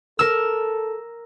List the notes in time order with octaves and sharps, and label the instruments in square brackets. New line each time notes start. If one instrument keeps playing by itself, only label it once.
[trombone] A4 [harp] A#4 E6